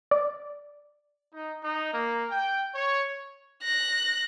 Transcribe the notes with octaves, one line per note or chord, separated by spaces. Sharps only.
D5
D#4
D#4
A#3
G5
C#5
F#6 A#6